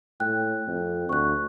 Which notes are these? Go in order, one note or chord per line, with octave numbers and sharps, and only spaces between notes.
A2 G5 F#6
F2
D2 C#6 F#6